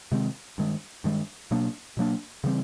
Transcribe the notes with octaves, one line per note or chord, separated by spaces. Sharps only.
C3 D#3 G#3 C4
G2 D#3 G#3
G2 D#3 G#3
B2 F#3 A#3 D4
B2 F#3 A#3 D4
C#3 E3 G3 C4